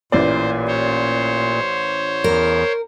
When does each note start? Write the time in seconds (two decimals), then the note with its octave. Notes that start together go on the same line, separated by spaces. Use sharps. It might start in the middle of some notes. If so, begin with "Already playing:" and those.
0.12 A1 A#2 E3 C5 D5
0.67 C5 C#5
2.24 E2 A#4